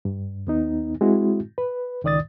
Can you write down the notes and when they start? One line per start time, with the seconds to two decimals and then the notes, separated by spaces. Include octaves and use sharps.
0.05 G2
0.47 D#2 B3 D#4
1.01 G#3 C4 E4 F#4
1.58 B4
2.04 C#2 D#3 D5 D#6 A6